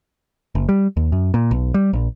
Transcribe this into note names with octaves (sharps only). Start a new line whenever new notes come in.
F#1
G3
D#2
F#2
A#2
B1
G3
A#1